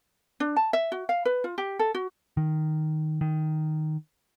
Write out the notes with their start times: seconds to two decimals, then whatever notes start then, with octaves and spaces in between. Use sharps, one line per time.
0.40 D4
0.56 A5
0.73 E5
0.92 F#4
1.09 F5
1.25 B4
1.44 F4
1.58 G4
1.79 A4
1.95 F#4
2.37 D#3
3.21 D#3